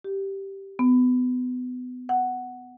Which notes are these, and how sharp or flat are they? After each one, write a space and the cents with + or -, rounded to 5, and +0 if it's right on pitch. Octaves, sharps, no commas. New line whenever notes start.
G4 -5
B3 +25
F#5 +5